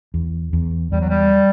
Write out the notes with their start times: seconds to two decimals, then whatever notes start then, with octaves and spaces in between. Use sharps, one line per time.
0.14 E2
0.53 E2
0.92 E2 G3
1.01 F#3
1.09 G3